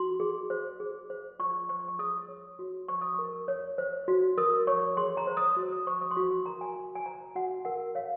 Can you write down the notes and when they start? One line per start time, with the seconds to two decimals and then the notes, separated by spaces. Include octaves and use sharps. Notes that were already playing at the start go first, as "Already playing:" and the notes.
Already playing: F#4 C6
0.20 G#4
0.50 C5
0.80 G#4
1.10 C5
1.39 F4 C#6
1.69 C5 C#6
1.79 C6
1.88 C#6
1.99 G#4 D#6
2.28 C#5
2.59 F#4
2.88 C5 C#6
3.01 D#6
3.14 A#4 C#6
3.48 C#5
3.78 C5
4.08 F#4
4.38 A#4 D#6
4.67 C#5 C#6
4.97 G#4 C6
5.17 A#5
5.27 C5
5.37 D#6
5.57 F#4
5.72 D#6
5.87 C5 C#6
6.01 D#6
6.11 C6
6.16 F#4 C#6
6.31 C6
6.46 A#4 A#5
6.61 G#5
6.76 F#4 G#5
6.95 G#5
7.06 C5 A#5
7.35 F#4 F#5
7.65 A#4 F#5
7.95 C#5 F5